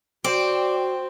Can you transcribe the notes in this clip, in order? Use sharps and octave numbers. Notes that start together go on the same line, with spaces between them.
C4 F#4 D5